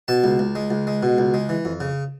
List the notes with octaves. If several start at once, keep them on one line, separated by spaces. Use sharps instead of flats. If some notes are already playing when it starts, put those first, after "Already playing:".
B2 A5
C#2
C#2
G#3
C#2
G#3
B2
C#2
G#3
E3
F2
C#3